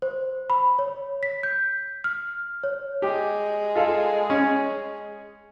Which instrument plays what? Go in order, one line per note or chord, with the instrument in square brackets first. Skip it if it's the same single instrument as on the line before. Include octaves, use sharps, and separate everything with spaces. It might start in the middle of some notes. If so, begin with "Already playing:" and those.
[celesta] C5
B5
C#5
B6
G6
F6
C#5
[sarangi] G#3 [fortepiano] G4
[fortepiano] F4 A4 F5
C#4